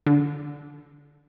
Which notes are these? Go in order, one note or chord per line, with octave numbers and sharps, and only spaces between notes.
D3